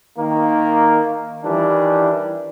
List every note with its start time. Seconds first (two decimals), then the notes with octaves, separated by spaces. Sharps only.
0.17 D#3 A#3
1.44 D#3 E3 G3 D4